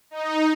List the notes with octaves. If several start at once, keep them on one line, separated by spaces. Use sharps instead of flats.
D#4